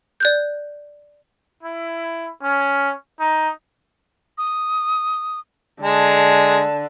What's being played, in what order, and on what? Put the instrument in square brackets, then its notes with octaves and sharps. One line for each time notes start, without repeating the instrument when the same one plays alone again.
[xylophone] D5 F#6 G6
[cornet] E4
C#4
D#4
[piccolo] D#6
[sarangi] D3 [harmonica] G#3 [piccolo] A5